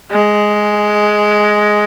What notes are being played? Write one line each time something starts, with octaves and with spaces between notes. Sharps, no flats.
G#3